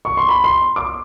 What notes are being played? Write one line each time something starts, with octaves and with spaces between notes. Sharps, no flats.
C#6
C6
B5
C6
D6